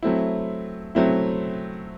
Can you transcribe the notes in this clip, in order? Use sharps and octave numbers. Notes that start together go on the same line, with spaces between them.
F#3 A3 C4 E4
F#3 A3 C4 E4